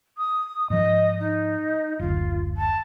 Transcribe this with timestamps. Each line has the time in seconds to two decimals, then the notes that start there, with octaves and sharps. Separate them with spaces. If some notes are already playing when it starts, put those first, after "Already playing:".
0.18 D#6
0.70 G#2 F3 D#5
1.20 D#4
1.99 F#1 D2 F4
2.57 A5